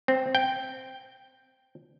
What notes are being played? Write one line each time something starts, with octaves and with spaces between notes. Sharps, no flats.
C4
G5